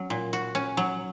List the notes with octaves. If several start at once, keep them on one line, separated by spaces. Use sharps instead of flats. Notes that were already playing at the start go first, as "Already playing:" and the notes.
Already playing: F#3 C#4
A#2
F#4
C#4
F#3